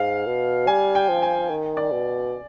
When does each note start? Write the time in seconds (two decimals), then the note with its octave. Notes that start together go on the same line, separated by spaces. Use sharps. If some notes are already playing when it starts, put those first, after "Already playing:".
Already playing: G#2 F5
0.26 B2
0.67 G3 G#5
0.95 G5
1.09 F3
1.22 G#5
1.50 D#3
1.77 D5
1.91 B2